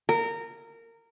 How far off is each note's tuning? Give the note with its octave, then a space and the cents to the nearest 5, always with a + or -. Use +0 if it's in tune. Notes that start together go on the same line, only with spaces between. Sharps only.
A#4 -20